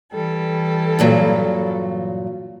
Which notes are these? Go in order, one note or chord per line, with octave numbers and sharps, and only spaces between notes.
E3 G3 A4
G2 A#2 F#3